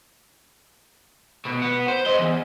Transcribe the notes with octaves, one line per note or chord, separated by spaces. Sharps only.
B2
B3
C5
C5 D#5
E2